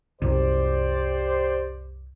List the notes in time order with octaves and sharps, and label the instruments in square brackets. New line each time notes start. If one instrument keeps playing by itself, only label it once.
[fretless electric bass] C2 F#2 [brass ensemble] G4 C5 D5